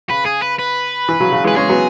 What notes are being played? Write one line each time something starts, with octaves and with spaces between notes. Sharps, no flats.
C#3 B4
G#4
B4
B4
E3
C#3 F#3
C#3 F#3
E3 G#3
B4
G#3 C#4 G#4
F#3 B3